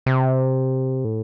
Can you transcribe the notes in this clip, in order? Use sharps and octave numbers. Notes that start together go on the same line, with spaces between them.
C3
A2